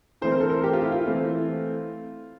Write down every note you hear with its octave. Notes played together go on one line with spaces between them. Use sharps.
E3 A3 C4 C5
A#4
A4
A#4
G4
F4
E4
F4
E3 A3 C4